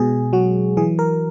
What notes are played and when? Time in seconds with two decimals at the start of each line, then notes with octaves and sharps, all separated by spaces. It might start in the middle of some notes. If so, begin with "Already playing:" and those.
Already playing: B2 G#3 G#4
0.33 F#3 F#4
0.77 E3 G#4
0.99 A#4